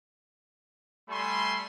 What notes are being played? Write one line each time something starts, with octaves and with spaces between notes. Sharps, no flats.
G3 A3 G#5 B5 C6